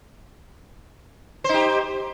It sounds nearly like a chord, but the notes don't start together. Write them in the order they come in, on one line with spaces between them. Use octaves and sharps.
C5 D#4 G4